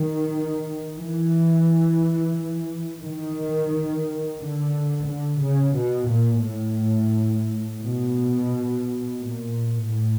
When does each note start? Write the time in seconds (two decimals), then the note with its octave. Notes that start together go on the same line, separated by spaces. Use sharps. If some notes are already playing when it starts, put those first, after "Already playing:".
Already playing: D#3
0.96 E3
3.02 D#3
4.39 D3
5.07 D3
5.42 C#3
5.75 B2
6.10 A#2
6.44 A2
7.82 B2
9.18 A#2
9.86 A2